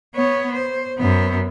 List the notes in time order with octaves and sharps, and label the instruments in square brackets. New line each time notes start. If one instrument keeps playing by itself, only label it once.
[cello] B3 C#5
C5
F#2 B3